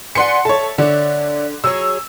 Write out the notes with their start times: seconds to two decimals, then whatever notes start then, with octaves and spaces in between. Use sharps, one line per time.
0.15 D4 B4 F#5 G#5 C6 C#7
0.45 A4 C#5 E5 A5
0.78 D3 D4 C#5 E5
1.64 F#3 G#4 C#5 E6